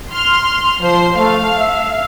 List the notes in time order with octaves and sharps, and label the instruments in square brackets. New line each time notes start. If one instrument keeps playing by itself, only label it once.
[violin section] C6 F6
[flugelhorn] F3 [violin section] C5 C7
[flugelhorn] A3 [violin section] F5
[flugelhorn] E5